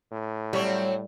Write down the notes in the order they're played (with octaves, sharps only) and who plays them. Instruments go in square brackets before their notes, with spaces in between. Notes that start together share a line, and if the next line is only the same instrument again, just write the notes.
[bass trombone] A2
[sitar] F#3 C4 C#5 [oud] G3